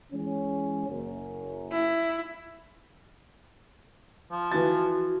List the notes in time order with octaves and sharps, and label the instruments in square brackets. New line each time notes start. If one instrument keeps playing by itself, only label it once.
[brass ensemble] E3 G#3 C#4
F#1 F#2
[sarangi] E4
[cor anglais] F3
[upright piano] E3 A6 [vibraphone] F#4